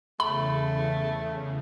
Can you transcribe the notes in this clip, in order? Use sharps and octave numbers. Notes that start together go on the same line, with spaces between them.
E2 C#3 A3 B5